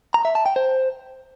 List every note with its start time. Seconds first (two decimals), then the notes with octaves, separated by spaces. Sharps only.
0.14 A#5
0.25 E5
0.35 A5
0.46 G5
0.56 C5